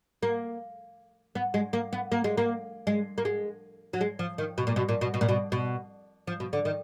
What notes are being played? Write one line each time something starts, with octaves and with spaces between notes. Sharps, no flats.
A#3
B3
G#3
A#3
B3
A#3
G#3
A#3
G#3
A#3
G#3
F#3
G#3
F3
D#3
B2
A#2
B2
A#2
B2
B2
A#2
B2
B2
F3
B2
D3
D#3